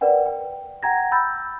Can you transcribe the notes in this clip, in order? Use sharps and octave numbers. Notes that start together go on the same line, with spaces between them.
A#4 B4 D5 F#5 G5
G5
F#5 G5 A#5 G#6 A#6
B5 E6 G6 A6